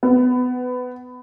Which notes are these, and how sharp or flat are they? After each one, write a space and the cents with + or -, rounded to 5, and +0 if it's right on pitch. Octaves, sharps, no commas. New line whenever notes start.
B3 +20